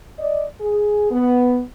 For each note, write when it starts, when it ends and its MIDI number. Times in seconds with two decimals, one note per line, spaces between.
0.18 0.44 74
0.18 0.44 75
0.61 1.09 68
1.11 1.60 59